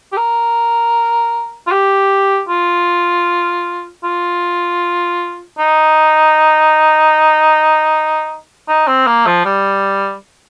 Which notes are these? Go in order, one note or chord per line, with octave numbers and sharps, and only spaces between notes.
G4
A#4
F4
G4
F4
F4
D#4
D#4
C4
A#3
F3
G3